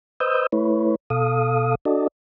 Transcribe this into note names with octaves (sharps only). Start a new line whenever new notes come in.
B4 C5 D#5 D#6 E6 G6
A3 E4 B4 C#5
B2 A4 F5 D#6
D4 F#4 A4 D5 D#5